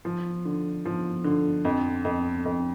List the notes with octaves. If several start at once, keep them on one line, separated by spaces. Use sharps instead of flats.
F3
D3
F3
D3
F2
F2
F2